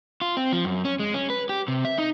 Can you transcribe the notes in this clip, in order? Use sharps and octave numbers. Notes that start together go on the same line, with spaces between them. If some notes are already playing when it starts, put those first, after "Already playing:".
F4
C4
F3
F#2
C#4
G#3
C#4
B4
G4
C3
E5
D#4